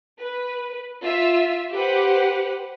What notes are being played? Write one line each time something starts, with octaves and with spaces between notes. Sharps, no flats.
B4
F4 E5 E6
G4 B4 C5 F#5